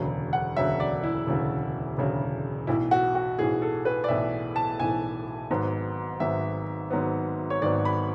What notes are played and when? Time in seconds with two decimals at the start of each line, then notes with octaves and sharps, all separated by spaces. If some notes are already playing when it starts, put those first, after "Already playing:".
Already playing: E1 D2 C#3 F#3
0.33 F#5
0.56 E1 D2 C#3 F#3 E5
0.80 D5
1.04 E4
1.27 E1 D2 C#3 F#3
1.97 E1 D2 C#3 F#3
2.67 B1 A2 E3 E4
2.91 F#4
3.15 F#4
3.38 B1 A2 E3 G#4
3.62 A4
3.85 B4
4.04 D5
4.08 B1 A2 E3 E5
4.56 A5
4.79 B1 A2 E3 G#5
5.50 G#1 G#2 F#3 B3
6.20 G#1 G#2 F#3 B3 E5
6.90 G#1 G#2 F#3 B3
7.50 C#5
7.62 G#1 G#2 F#3 B3 D5
7.85 B5